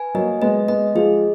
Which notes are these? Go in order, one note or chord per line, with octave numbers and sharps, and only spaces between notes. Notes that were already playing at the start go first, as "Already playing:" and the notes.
Already playing: B4 G#5
F#3 A#3 D#5
G#3 B3 D#5
G#3 B3 D#5
F3 G#3 G#4